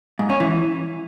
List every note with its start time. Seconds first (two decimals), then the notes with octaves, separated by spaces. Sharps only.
0.19 G#2
0.30 C#4
0.40 E3